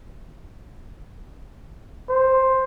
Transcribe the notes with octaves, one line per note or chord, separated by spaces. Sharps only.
C5